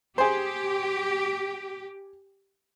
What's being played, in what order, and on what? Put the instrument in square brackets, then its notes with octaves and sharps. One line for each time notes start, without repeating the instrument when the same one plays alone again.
[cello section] G4 [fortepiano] G#4 C5